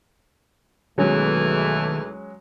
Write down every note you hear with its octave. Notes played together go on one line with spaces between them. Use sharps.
B1 E2 D#3 E3 F#3 G#3 A3 C#4